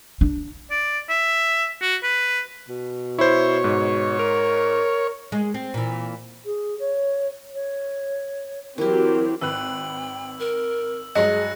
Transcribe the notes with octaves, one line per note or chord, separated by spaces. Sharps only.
D4
D5
E5
F#4
B4
B2
E4 C5 C#5
G#2
A#4
G#3
C4
A#2 E3
G#4
C#5
C#5
E3 F#3 C4 E4 G4 A#4
G#1 B4 G5 E6 F#6 F#7
A#4
G2 F#3 G#3 G#4 D#5 F#6 A#6 C#7